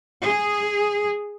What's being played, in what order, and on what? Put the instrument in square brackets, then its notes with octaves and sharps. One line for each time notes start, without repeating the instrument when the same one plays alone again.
[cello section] G#4